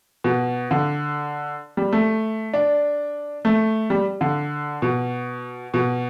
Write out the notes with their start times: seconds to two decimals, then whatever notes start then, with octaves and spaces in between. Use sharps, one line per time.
0.24 B2
0.71 D3
1.77 G3
1.93 A3
2.53 D4
3.45 A3
3.90 G3
4.21 D3
4.82 B2
5.74 B2